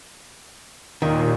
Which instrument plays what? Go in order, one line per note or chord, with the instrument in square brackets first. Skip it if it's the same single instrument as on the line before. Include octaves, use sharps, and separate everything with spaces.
[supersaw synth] D#2 A#2 [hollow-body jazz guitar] D#3